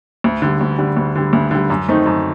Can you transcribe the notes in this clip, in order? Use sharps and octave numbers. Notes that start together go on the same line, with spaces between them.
D2
D3 G3
D2
D3 G3
D2
D3 G3
D2
D3 G3
F#2
D#3 A3 C4 D#4
F#2